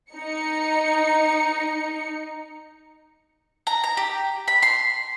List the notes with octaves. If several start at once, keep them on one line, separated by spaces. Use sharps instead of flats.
D#4 C#7
A#5
A#5
G4
B5
C6